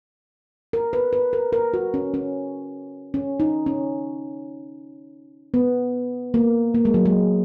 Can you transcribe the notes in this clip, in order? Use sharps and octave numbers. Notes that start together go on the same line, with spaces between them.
A#4
B4
B4
A#4
A#4
F#4
C#4
C#4
C#4
D#4
C#4
B3
A#3
A#3
G#3
F#3
G#3